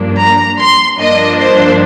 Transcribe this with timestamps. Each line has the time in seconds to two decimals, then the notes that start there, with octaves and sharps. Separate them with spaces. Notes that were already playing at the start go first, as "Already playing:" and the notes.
Already playing: G2 F3 A#3 D4
0.17 A#5
0.58 C6
0.98 G2 F3 A#3 D4 D#5
1.39 C5